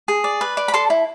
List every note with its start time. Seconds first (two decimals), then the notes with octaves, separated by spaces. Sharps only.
0.08 G#4
0.24 D5
0.41 B4
0.57 D5
0.68 B5
0.74 A4 A5 C6
0.90 E4